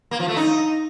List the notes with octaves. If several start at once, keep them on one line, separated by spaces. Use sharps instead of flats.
A#3
F3
A3
D#4